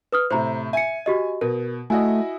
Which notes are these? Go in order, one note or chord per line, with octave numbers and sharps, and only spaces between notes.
B4 D#6 F6
A2 C3 C5 A#5
E5 G#5 C#7
F#4 G4 D#5
B2 A#4
A3 E4 F#4 D#5 G#5